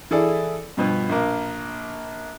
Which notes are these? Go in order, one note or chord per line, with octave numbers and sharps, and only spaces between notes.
E3 E4 G#4 A4 D5
G2 B2 F3 B3
A#1 A#3